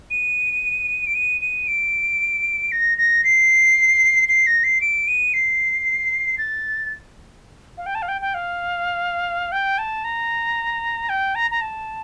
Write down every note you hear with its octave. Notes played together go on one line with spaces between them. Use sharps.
D#7
D7
D#7
D#7
D7
A#6
A#6
C7
C7
A#6
C7
D7
D#7
C7
A6
F5
G5
A5
F5
G5
G5
F5
G5
A5
A#5
G5
A#5
A#5
A5